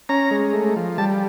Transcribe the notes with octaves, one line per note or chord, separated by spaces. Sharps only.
C#4 A#5
G#3
A3
F3
G3 A5